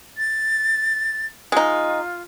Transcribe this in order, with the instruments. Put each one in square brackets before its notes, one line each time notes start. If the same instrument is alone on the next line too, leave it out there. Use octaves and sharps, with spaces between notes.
[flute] A6
[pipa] G#3 D#4 [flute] F4